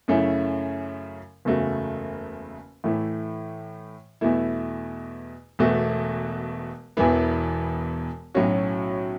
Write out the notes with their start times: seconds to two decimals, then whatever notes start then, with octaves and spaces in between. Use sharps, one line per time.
0.08 F#2 C#3 A3 C#4 E4
1.45 F#1 E2 C#3 A3 F#4
2.84 A2 E3 A3 E4
4.21 E2 B2 A3 E4
5.59 E1 E2 B2 A3 F#4
6.97 E1 E2 E3 B3 E4
8.34 B1 A2 F#3 C#4 F#4